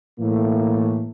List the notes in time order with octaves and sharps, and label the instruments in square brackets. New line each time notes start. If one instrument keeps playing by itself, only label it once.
[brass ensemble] A2 E3 A3 A#3